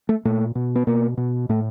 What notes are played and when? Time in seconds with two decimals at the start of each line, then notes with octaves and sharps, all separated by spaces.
0.09 A3
0.25 A#2 A3
0.55 B2
0.75 B3
0.87 B2 A#3
1.17 B2
1.49 A2 A3